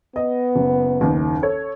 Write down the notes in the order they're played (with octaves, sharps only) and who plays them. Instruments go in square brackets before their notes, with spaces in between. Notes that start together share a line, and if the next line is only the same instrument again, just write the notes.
[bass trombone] B3 [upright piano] D#5
[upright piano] F#1
F#1 D#2 D#3
A4 C#5